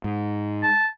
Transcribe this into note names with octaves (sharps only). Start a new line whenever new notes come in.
G#2
A5